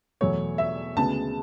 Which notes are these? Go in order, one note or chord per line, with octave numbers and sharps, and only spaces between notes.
E2 B2 F#3 A3 C#5
E5
D2 C#3 G#3 B3 A5